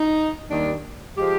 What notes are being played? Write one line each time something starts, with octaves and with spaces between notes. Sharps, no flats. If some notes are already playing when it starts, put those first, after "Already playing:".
Already playing: D#4
D#2 D#3 G3 D4
F3 G#3 G4